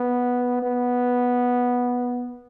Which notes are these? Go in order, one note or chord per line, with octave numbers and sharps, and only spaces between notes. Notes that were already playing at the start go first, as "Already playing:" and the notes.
Already playing: B3
B3